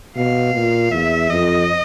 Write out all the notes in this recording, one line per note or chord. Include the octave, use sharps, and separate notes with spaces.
B2 F5
A#2
E2 E5
F2 D#5